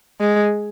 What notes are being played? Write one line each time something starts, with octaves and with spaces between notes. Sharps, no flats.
G#3